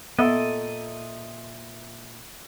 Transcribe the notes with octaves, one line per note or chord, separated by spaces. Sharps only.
A#2 B3 A4 D#5 E5